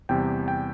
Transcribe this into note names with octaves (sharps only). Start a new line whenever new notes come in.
E2 C3 G3 G5
G5